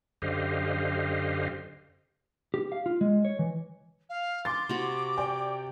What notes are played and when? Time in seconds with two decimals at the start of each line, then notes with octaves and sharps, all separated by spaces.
0.22 F#2 D3 G4 C5 D#5 F5
2.54 G4
2.72 F5
2.86 F4
3.01 G#3
3.25 C#5
3.39 E3
4.09 F5
4.45 C6 D6 A6
4.69 C3 F#4 B5
5.18 D5 G5